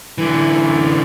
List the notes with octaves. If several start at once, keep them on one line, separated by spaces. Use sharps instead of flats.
D3 E3